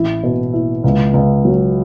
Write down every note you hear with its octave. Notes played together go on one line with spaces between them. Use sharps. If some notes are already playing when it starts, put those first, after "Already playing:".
Already playing: A1 E4
B2
E4
C#2
C#2
F#3